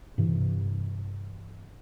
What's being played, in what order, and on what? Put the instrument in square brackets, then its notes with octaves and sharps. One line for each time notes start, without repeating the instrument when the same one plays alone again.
[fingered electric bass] G2 C3 E3